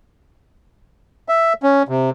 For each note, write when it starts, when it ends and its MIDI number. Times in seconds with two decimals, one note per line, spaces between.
1.29 1.53 76
1.63 1.83 61
1.89 2.10 48